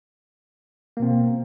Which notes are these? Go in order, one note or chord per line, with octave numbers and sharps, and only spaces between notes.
B2 A#3 C4